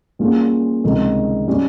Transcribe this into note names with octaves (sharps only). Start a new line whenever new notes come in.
A#2 G3 C#4 F4 G#4
C#2 C3 D#3 G3
G3 C#4 G4